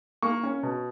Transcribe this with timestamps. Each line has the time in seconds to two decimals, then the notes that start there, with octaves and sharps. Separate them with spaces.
0.22 A#3 C#6
0.43 C#4
0.63 B2